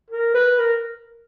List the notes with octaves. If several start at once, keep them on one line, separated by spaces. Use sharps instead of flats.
A#4
B4
A#4